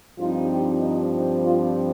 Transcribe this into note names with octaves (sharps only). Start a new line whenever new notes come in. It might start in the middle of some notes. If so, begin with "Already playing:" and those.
G2 F3 C4 D#4 F4
G4
D#4
F4